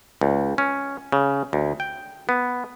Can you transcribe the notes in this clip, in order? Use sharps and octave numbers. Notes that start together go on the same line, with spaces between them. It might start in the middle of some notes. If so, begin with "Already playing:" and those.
C#2
C#4
C#3
D2
G5
B3